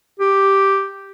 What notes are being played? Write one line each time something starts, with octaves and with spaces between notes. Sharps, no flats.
G4